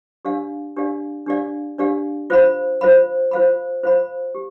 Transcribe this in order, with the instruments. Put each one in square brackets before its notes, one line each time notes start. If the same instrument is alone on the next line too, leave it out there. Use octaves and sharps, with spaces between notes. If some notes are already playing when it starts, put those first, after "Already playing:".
[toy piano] D4 G4 D5 F5
D4 G4 D5 F5
D4 G4 D5 F5
D4 G4 D5 F5
F4 C5 F5 B5
F4 C5 F5 B5
F4 C5 F5 B5
F4 C5 F5 B5
G4